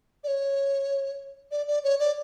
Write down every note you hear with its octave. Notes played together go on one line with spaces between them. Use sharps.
D5
C#5
D5
D5
C#5
D5